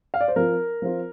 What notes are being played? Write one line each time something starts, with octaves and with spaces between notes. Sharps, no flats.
F5
D5
C5
F3 C4 F4 A#4
F3 C4 F4